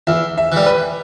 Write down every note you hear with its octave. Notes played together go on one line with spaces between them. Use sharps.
E2 E5
E5
E3 G3
B4